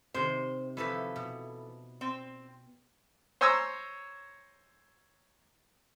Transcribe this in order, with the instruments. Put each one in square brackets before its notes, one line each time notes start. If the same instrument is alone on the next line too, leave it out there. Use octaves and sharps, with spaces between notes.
[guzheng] C3 D#3 [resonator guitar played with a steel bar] C5
[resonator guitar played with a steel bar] E3 A4 B4 [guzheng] F3 E4
[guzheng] B2
[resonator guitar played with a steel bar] C4
[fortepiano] C5 C#5 G#5 A#5 E6